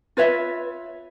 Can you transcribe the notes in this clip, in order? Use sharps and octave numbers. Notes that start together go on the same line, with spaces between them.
F4 B4 C#5 E5